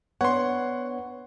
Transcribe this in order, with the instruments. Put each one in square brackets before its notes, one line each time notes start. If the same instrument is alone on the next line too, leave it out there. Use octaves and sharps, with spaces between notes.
[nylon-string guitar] B3 D4 [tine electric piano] C#5 [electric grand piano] F#5 C6